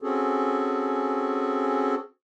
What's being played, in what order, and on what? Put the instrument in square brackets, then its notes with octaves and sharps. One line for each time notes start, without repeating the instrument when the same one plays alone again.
[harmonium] C4 C#4 F#4 G#4 A4